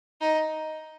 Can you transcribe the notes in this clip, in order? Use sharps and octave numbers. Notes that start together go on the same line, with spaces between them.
D#4